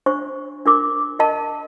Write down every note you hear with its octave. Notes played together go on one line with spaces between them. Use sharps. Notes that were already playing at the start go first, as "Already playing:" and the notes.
D4 C5 C#6
D4 A#4 D6
A#4 D#5 A5